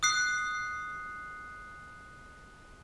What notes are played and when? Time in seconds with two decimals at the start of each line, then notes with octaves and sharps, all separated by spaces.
0.03 D#6 F#6 C7